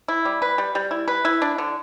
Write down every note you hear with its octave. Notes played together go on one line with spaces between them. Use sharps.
E4
G3
B4
G3
G3
E4
B4
E4
D4
D3